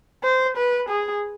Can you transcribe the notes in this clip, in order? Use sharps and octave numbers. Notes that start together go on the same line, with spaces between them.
C5
B4
G#4